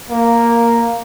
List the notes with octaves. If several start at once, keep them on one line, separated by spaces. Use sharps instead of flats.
A#3